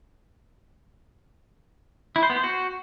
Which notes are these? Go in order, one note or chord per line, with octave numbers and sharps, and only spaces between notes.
E4
C5
B3
C5
F#4